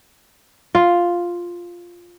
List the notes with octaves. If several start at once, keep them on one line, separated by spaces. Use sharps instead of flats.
F4